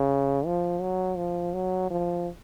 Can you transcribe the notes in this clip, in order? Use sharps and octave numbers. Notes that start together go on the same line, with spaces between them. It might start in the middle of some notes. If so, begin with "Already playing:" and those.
Already playing: C#3
F3
F#3
F3
F#3
F3